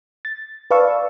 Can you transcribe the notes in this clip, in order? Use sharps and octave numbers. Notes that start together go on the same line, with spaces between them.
A6
B4 D5 F5 A5 C#6 E6